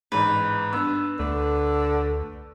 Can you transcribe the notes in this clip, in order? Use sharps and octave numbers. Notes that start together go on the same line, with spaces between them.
A1 G#2 B4
G2 B3 E6
D2 D3 A3